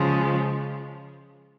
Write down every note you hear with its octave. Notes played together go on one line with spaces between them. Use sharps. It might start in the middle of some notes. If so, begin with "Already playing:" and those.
Already playing: C#3 F3 G#3